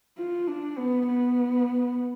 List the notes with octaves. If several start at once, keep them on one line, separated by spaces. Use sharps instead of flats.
F4
D4
B3
B3